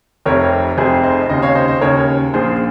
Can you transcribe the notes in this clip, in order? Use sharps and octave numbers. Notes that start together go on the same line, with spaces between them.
F1 F2 C3 A#4 C#5
F1 F2 C3 G#4 C5
C5 D#5
D#2 C#3 C5 D#5
C#5 F5
C5 D#5
C5 D#5
D#2 C#3 A#4 C#5
A#1 A#2 G#4 C5